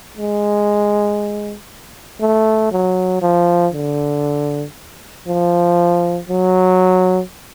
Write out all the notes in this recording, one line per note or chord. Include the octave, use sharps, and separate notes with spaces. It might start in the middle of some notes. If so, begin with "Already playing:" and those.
G#3
A3
F#3
F3
D3
F3
F#3